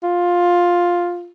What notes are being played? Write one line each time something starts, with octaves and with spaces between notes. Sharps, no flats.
F4